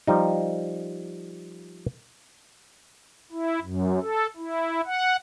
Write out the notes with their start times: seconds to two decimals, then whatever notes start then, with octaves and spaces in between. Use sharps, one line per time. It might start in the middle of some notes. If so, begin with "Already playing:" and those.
0.07 F3 G3 D#4
3.32 E4
3.62 F#2
4.02 A4
4.37 E4
4.86 F#5